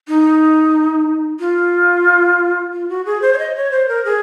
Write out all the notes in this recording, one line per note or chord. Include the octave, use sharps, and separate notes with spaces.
D#4
F4
F4
F#4
G#4
C5
C#5
D#5
C#5
C5
A#4
G#4